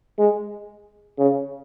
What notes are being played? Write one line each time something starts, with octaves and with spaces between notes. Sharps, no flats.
G#3
C#3